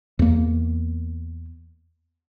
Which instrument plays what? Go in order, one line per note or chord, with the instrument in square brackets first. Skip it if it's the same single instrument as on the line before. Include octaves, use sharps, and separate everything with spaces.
[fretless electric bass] E2 A#3